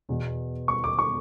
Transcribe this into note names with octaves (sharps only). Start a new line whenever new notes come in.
E2 B2
C#6
D6
C#6